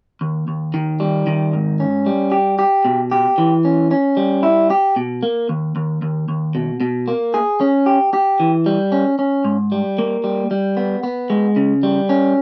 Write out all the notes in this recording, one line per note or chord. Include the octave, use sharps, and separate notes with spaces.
D#2
D#2
D#3
G3
D#3
G#2
C#4
G3
G4
G4
B2
G4
E3
C#4
C#4
G3
E4
G4
B2
A#3
D#2
D#2
D#2
D#2
B2
B2
A#3
G#4
C#4
G4
G4
E3
G3
C#4
C#4
G#2
G3
A#3
G3
G3
B3
B3
G#3
C#3
G3
C#4